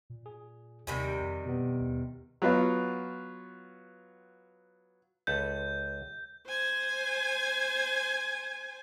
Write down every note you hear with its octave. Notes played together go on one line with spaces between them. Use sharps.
A#2
G#4
D#2 C3 D#3 G3 G#5 B5
F2
B2 B3
D#2
F#3 B3 F4
C#2 A4 B4 G6
C5 G#5